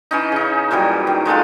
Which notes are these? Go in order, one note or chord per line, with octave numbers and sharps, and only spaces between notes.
E3 C#4 D#4
C#3 D#4
A#2 E3 F#3 G3
D#3
D#3 G#3 A3 F4